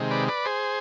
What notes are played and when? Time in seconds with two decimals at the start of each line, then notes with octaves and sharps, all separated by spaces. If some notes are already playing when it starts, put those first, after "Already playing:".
Already playing: C3 D#3 G#3
0.11 B4 D5
0.28 B4 D5
0.45 G#4 C5